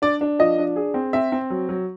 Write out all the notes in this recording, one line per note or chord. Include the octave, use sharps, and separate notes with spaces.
D4 D5
D4
F3 D#5
D4
G#4
C4
C4 E5
C4
F#3
F#3